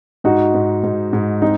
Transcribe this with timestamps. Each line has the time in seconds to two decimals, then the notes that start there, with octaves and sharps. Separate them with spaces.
0.24 G#2 D#4 F#4
0.54 G#2
0.83 G#2
1.13 G#2
1.42 C4 D#4